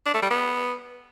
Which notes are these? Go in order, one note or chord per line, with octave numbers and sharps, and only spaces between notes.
D4
A3
G3
B3